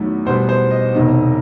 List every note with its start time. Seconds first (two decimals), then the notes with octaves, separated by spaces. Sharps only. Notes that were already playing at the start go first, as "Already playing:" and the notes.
Already playing: E2 D#3 F#3 A3 E4
0.25 E2 B2 G3 B3 C5
0.49 C5
0.71 D#5
0.94 E1 E2 C3 D#3 D#5